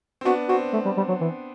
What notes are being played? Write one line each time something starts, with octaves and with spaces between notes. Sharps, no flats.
C4
B3 D4 F#4
C4 F#4
A3
G3
G3
F#3
E3